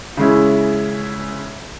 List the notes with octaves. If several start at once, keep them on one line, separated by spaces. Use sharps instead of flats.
C#3 G#3 C#4 E4